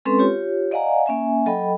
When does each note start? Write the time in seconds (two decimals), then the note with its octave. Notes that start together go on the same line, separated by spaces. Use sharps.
0.05 G#3 C4 C#4 A4 B4 C6
0.19 F4 G4 C#5
0.71 D5 D#5 F5 F#5 G#5 A#5
1.06 A#3 C#4 E5 G#5
1.46 F#3 A4 D#5 G5 B5